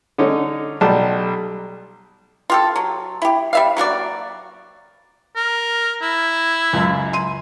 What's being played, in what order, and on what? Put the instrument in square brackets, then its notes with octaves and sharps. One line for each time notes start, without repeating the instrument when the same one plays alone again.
[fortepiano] D3 C#4 D#4
B1 G3 A5
[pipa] F4 G4 A4
F#3
E4 G4
G3 E5 F5
F#3 A#3 F#4 D5
[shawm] A#4
E4
[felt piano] C#2 F#2
C6 D#7